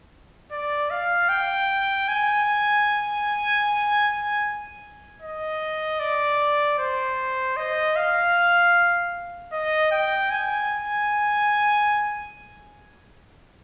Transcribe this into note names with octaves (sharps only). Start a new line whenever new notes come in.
D5
F5
G5
G#5
D#5
D5
C5
D#5
F5
D#5
G5
G#5